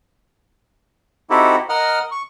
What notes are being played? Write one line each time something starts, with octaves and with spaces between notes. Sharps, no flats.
C4 D#4 E4 F#4 G4 A4
A#4 D#5 F#5 F6
C#6